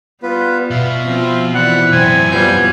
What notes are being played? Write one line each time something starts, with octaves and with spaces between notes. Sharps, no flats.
G3 B3 F4 B4
B2 E5 F5
F3 C4 F4
E3 E4 D5 F#5
F#2 A2 C4 G#5
F#3 G3 B3 F4 G6